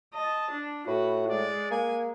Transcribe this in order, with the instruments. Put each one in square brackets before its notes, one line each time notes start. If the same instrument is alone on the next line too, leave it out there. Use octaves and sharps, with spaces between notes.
[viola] D#5 [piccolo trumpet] A5
[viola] D4
[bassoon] A2 [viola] F#4 [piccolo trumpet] B4
[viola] G#3 [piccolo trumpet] D5
[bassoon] A#3 [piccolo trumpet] G#5